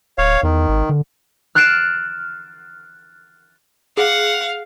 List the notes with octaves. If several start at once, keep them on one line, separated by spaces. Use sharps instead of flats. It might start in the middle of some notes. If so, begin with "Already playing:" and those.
D1 C#5 F5
E2 D#3
G#1
D3
F6 F#6 A6 C7 D7 E7
G#4 F5 F#5